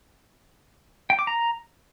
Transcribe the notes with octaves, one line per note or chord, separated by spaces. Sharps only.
G5
D6
A#5